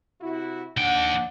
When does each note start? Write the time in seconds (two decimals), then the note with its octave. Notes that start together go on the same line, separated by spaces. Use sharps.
0.21 C3 E4 F#4
0.77 D#2 D4 F#5 G5